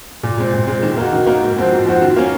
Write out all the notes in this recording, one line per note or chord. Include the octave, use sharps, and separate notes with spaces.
A#2
G#3 C4
A#2
G#3 C4
D#3
A#3 D#4 F#4
D#3
A#3 D#4 F#4
G#2
F3 C4 F#4
G#2
F3 C4 F#4
D#3
A#3 C#4